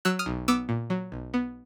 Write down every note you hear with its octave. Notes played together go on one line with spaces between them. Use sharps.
F#3 E6 F#6
D#6 F6
B1
B3 D6 E6
A#2
F#3
B1
B3